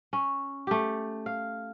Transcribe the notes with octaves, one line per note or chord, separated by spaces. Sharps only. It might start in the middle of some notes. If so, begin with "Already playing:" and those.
C#4
A3 G4
F5